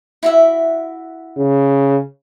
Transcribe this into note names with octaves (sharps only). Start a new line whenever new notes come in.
E4 F#4 E5
C#3